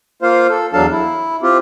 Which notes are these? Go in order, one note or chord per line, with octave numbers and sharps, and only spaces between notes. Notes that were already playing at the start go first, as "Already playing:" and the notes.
A#3 F4 C5 F5
A4
E2 F#3 D4 A4 F5 A5
E4
C4 F4 G4